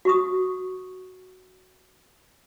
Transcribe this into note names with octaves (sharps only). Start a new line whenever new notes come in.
F#4 C#6 D#6